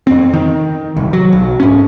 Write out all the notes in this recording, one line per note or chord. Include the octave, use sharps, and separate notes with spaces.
F2 C4
D#3
D1 C2
F#3
B1
G#2 C#4